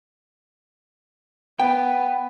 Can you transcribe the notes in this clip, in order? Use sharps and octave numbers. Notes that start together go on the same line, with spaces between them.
B3 G5